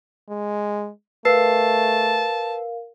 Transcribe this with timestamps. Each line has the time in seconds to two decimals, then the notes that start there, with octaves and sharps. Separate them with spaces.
0.29 G#3
1.25 A3 A#4 B4 F5 A5 E6 C7